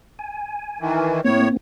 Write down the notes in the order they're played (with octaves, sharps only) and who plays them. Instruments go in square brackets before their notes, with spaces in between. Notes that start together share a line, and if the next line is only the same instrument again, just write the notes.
[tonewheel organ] G#5
[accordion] D#3 E3
[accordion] A2 C#5 [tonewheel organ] A#3 C4